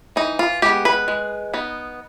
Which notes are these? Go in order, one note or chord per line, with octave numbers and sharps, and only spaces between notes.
E3 D#4
F4
G#3 B3 G4
B4
G#3
B3 D#4